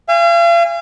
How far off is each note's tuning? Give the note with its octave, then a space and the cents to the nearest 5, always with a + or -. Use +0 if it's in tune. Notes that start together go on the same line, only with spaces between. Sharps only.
F5 -40 G#5 -30